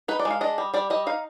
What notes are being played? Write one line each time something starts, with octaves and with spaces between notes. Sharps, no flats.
D#4 B4
D5
G#3
F5
D4 D#5
G3
G3 D5
G3 D#5
D#4 F5